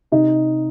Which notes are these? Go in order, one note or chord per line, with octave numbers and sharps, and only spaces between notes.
C3 D#4